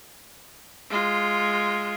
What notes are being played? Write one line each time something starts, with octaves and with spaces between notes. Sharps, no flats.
G#3 F4